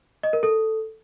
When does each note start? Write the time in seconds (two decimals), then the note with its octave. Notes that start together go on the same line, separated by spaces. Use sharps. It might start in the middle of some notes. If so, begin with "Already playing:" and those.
0.23 D#5
0.33 A#4
0.43 A4